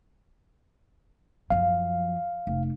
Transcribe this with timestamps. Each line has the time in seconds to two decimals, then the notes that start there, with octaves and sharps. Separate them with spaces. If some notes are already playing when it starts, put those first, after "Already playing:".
1.50 F#2 F3 F5
2.47 F1